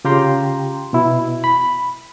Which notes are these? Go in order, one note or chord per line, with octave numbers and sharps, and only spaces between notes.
C#3 F4 G4 G5 A#5 C6
B2 E4
B5